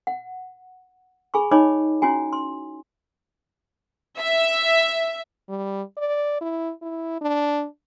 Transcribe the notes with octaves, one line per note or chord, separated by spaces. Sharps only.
F#5
G#4 G#5 B5 C#6
D#4 C#5 D#5 G#5 B5 D6
C#4 E4 F#4 G#5
C6
E5
G3
D5
E4
E4
D4